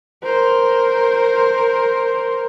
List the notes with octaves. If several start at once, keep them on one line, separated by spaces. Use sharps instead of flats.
A#4 C5